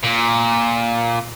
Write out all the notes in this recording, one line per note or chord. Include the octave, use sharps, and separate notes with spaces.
A#2